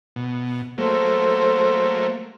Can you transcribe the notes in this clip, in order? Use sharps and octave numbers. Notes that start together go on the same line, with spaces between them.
B2
F#3 A3 A#3 A4 C5